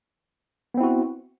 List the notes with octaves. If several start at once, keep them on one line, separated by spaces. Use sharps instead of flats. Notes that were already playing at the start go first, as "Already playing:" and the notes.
B3 C4 E4 F#4